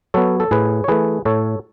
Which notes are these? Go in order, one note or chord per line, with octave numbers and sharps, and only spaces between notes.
F#3 B3 A4 C#5
A4
A2 G#4 B4
C#5
E3 A3 G#4 B4
A2 A4 C#5